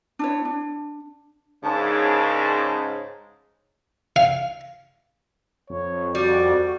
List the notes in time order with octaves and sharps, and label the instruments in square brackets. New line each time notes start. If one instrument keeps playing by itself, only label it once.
[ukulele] D4 E4 C#5
D4
[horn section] G#2 C#3 [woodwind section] D4 A#4 A5
[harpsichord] F5
[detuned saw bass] F2 [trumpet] C#5
[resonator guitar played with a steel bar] G3 [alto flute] F#4 [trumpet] D5